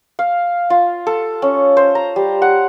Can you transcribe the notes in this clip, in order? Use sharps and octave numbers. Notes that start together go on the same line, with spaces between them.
F5
F4
A4
C#4
C5
A#5
G3
F#5